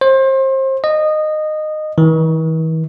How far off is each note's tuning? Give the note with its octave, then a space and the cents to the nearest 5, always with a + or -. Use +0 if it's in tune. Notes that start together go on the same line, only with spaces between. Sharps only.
C5 +30
D#5 -15
E3 -45